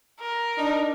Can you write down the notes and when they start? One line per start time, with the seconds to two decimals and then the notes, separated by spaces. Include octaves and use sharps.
0.20 A#4
0.58 D4 D#4